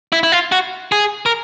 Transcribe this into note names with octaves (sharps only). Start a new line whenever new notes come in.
E4
E4
F4
F#4
G#4
A#4